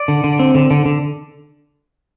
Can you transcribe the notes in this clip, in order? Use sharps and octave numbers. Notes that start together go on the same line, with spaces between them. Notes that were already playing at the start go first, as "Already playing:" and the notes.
Already playing: D5
D3
D3
C4
D3
D3
D3